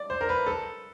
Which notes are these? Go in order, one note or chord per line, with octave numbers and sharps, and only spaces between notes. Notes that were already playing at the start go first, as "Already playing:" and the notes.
Already playing: D5
C5
A#4
B4
A4